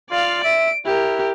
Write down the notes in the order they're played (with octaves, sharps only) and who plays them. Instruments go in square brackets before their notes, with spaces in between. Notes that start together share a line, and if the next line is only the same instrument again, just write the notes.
[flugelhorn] F4 [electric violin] D5 F5
[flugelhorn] E5 [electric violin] D7
[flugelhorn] E4 [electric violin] G4 A#4